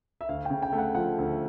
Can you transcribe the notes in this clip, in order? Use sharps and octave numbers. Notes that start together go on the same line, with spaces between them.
E5
D2 F5
C#3 G5
G5
A3
F#5
F3 F#5
D2